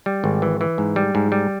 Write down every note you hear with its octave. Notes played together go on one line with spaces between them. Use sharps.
G3
G#1
E3
E3
G#2
G3
G#2
G3